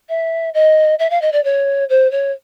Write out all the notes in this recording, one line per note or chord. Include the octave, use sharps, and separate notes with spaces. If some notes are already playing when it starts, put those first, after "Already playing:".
E5
D#5
E5
F5
D#5
D5
C#5
C5
C#5